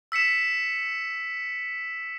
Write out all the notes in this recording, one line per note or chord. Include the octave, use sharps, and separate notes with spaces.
E6 B6 C#7 E7